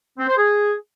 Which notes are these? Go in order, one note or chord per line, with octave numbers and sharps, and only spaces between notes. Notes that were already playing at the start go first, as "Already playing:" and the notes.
C4
C5
G#4